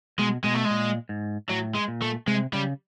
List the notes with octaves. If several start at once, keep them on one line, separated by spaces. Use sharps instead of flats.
B2 G#3
B2 G#3
A3
G#3
A#2
G#2
A2 F#3
G#3
A#2
A3
C3 G#3
C#3 G3